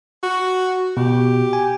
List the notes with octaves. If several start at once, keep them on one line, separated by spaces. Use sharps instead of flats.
F#4
B2 G4
G#5